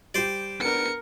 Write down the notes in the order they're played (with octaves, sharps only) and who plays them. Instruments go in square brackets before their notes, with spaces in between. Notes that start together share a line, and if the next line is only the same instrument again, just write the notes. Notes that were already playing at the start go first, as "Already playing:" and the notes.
[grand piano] G3 G4 [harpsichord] C5 D5
[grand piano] B3 D4 [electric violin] A#4 C#7